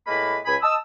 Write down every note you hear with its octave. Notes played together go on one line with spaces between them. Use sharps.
A2 G#3 A#3 B4 B5
C#2 G#5 B5
D#5 A5 D#6 E6